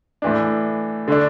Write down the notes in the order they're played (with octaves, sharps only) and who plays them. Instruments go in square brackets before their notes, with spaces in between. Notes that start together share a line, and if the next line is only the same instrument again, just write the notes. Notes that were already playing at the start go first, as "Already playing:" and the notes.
[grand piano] A2 E3 D4
D3 A3 D4